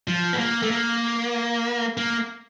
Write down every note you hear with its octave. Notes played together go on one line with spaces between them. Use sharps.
F3
B3
A#3
A3
A#3
A#3